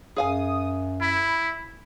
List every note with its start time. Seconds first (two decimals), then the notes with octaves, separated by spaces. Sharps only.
0.16 F#2 G#4 F5 G#5 D#6
1.01 E4 B5